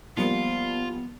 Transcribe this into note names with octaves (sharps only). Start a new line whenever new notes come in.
F3 G3 A#3 B3 F4